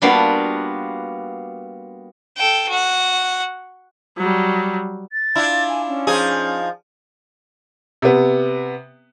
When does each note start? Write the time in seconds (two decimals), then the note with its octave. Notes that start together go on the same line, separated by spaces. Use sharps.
0.02 G3 A#3 B3 D4 F4 F#4
2.37 A4 G5
2.69 F#4 F#5
4.17 F#3 G3
5.12 A6
5.35 D4 E4 F4
5.69 G#5
5.88 C#4
6.07 F3 D#4 G#4
8.02 C3 B3